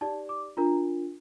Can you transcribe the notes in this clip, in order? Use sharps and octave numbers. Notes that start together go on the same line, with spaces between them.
D#4 G4 D5 A5
D6
D4 F4 A#4 A#5